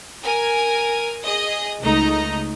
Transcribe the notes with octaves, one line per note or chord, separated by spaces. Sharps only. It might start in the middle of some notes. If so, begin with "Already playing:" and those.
A#4 G#5
G#4 D#5 D#6
C#2 A3 D#4 D#5 A#5